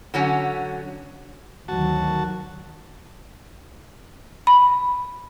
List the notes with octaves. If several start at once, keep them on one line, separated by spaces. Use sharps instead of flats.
D3 F#3 C#4
D2 D#3 F#3 F#4 A5
B5